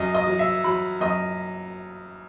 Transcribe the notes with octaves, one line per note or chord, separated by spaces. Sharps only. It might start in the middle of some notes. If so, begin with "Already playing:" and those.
Already playing: F#2 D#5
D#5
F#3
E5
F#3 B5
F#2 D#5